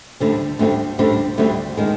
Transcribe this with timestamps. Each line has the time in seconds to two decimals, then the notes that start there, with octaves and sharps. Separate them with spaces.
0.20 D2 D3 G3 C4
0.59 D2 D3 G3 C4
0.99 D2 D3 G3 C4
1.38 D2 D3 G3 C4
1.77 D#3 G#3